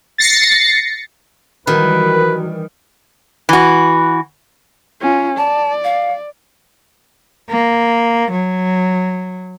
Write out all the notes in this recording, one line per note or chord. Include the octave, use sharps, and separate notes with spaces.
A6 A#6 C7 C#7
D#3 E3 F#3 G3 F#4 A#4 B4
E3 F#4
C#4 F4
D5 A5
F5
A#3
F#3